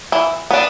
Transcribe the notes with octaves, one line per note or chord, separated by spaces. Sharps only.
E3
B3 D4